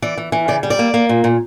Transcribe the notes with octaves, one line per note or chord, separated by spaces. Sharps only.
E3 D5
E3
E3
C#3 D5
G3
D5
A#3
A#3
A#2
A#2